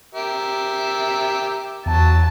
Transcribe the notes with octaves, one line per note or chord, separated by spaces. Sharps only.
G4 A#4 E5
E2 F#3 A5